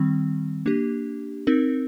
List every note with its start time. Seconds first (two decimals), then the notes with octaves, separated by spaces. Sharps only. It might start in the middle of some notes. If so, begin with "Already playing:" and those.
Already playing: D#3 G3 C4
0.66 A#3 D4 G4
1.47 C4 D#4 A#4